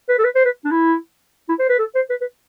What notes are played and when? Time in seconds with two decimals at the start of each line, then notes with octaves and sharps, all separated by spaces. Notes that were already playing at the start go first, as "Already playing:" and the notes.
0.09 B4
0.19 A4
0.24 B4
0.35 C5
0.45 B4
0.65 D4
0.71 E4
1.49 E4
1.59 C5
1.69 B4
1.79 A4
1.95 C5
2.10 B4
2.21 B4